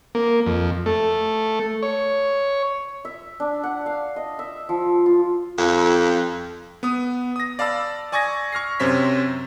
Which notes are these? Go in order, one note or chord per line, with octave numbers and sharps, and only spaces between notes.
A#3
F2
A3
C#5
E5
D4
F#5
F5
D#5
E5
F3
F4
F2
B3 D#6
D#6 A#6
D5 F5 A5 B5 E6
D5 G#5 C#6 D#6 G#6 A#6
C#6 F6 A#6 C7
F#2 C3 C5 C#5 B6